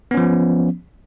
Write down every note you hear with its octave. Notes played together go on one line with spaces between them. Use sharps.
F3 B3 C#4